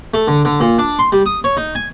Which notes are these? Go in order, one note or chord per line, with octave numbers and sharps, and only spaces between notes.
A3
D3
D3
A#2
D4
C6
G3
D#6
C#5
D#4
G#5